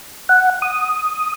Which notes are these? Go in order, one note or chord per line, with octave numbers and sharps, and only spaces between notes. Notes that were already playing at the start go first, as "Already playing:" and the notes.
F#5
D#6